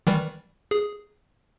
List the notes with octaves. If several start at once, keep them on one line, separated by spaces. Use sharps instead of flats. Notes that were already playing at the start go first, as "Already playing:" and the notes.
D#3 E3 G3
G#4